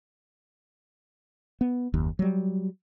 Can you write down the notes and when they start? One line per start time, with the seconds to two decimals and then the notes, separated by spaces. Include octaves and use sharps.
1.61 B3
1.94 F#1 D#2
2.19 F#3 G3